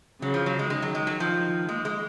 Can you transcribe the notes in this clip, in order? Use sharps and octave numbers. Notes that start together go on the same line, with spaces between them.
C#3 F#3
F3
F#3
G#3
D#3 G#3
F#3
G#3
F#3
F3
G#3 A#3
G#3